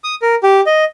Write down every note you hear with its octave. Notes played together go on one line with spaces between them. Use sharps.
D#6
A#4
G4
D#5